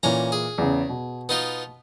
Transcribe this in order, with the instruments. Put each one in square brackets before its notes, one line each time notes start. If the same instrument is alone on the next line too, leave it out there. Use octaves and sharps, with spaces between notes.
[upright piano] A#2 E3 [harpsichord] C#4 A#5
[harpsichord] G#4
[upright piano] E2 C#3
B2
[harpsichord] B3 D#4 F4